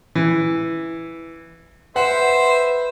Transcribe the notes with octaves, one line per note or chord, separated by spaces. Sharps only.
E3
B4 C5 E5 F#5